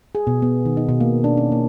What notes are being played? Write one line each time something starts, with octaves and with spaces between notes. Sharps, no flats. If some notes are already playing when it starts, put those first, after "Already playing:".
G#4
B2
B3
D#3
D#4
B2
A#3
D4
C#4
A#3